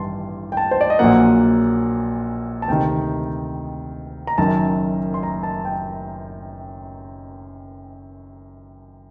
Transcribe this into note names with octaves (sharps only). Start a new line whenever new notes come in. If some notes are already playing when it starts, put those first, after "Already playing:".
Already playing: A1 G2 D#3 A5 C6
G5
A5
C5
D5
D#5
A#1 A#2 F#3 A#3 F#5
A5
D2 C3 D#3 G5
A#5
F#1 F#2 D#3 A5
C6
A#5
A5
G5